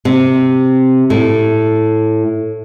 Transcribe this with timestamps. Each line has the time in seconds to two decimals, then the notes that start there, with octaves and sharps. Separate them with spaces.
0.05 C3
1.10 A2